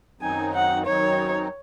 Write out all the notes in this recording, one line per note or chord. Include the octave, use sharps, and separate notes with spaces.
F#2 D#3 F#3 C4 D#4 G#5
F#5
F#2 D#3 F#3 C4 D#4 C#5